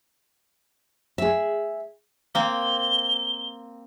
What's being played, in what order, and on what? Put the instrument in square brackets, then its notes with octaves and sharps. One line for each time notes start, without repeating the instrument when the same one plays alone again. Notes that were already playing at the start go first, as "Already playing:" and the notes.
[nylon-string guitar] G#4 E5
[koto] A#3 C4 [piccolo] G7